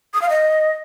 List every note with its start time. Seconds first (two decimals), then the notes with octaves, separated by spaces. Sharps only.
0.14 D#6
0.22 F5
0.30 D#5